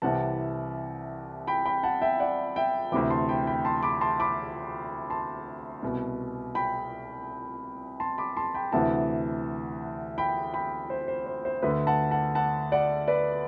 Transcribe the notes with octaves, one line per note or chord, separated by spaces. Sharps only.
C2 C3 E3 F#5 A5
G5 B5
G5 B5
F#5 A5
E5 G5
D5 F#5
E5 G5
D2 C3 E3 B5 D6
A5 C6
G5 B5
G5 B5
A5 C6
B5 D6
A5 C6
B5 D6
A5 C6
C2 B2
G5 B5
A5 C6
B5 D6
A5 C6
G5 B5
D2 C3 E3 F#5 A5
G5 B5
G5 B5
C5
C5
C5
C5
D2 D3 B4
F#5 A5
F#5 A5
F#5 A5
D5 F#5
B4 D5